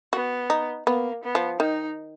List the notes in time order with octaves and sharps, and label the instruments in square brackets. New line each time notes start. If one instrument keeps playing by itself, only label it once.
[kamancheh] B3 [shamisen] F#4
[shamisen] D#4
[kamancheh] A#3 [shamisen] B3
[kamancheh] B3
[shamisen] F3
[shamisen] D#3 [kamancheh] D#4